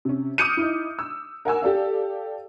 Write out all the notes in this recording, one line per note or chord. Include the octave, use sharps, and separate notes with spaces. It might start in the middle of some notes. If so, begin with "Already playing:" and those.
C3 C#4
D6 D#6 F6 G6 C#7 D#7
D#4 E4
E6
A#4 F#5 G#5 E6
G4 A4 D5 F5